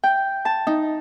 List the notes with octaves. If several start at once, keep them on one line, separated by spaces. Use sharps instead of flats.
G5
A5
D#4